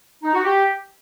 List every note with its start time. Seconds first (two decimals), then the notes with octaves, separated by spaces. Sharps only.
0.23 D#4
0.34 F#4
0.44 G4